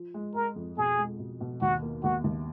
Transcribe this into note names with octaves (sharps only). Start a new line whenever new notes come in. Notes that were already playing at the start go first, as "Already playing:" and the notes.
Already playing: F3
G#3
G#3 A#4
F2
B2 G#4
G#3
B2
B2
D#2 F#4
A#3
D#2 F#4
D#2